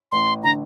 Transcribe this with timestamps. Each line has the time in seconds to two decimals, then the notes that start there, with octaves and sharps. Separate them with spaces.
0.12 A1 C6
0.43 D3 A#5